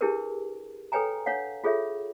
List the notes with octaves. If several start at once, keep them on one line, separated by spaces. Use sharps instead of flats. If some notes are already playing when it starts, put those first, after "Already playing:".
D4 E4 G4 G#4 A#4 B4
A4 B4 C#5 G5 G#5 A#5
D4 C#5 F5 F#5
F4 G#4 A4 C#5 E5